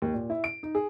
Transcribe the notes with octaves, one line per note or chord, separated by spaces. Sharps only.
D#2
A#2
E4
D7
D#4
G#4